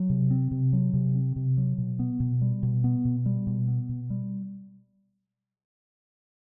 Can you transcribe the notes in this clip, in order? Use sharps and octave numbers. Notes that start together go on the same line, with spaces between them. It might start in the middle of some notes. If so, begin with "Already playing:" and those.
Already playing: F#3
C3
C4
C3
F#3
C3
C4
C3
F#3
B2
B3
B2
G3
B2
B3
B2
G3
B2
B3
B2
G3